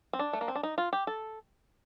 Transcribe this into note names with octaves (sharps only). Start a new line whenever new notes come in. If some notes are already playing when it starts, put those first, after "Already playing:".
C4
D4
A3
A#3
C4
D4
D#4
F4
G4
A4